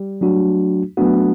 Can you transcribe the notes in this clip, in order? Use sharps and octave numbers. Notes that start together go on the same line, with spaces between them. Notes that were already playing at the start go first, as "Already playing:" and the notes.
Already playing: G3
F#3 A3 D4 F#4
F#3 A3 B3 D4 F#4